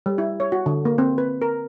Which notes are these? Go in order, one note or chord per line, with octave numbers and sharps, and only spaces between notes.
G3
E4
C#5
F#4
D3
A#3
C4
B4
A#4